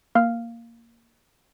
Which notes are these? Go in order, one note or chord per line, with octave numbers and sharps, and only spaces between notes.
A#3 F5 F6